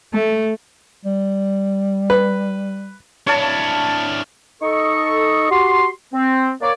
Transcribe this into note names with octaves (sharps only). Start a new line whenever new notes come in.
A3
G3
B4
D4 E4 C#5 F5 A5
D#4 A4 D#5 C#6
F#4 G4 C6
C4
A#3 C#5 D5